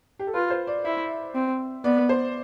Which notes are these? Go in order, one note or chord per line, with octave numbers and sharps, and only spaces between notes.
G4
A4
F4 B4
C5
D5
E4 E5
C4
B3 D5
C5